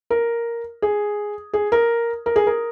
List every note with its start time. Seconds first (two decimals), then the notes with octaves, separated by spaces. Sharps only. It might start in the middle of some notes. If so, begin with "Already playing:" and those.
0.10 A#4
0.82 G#4
1.53 G#4
1.72 A#4
2.26 A#4
2.36 G#4
2.47 A#4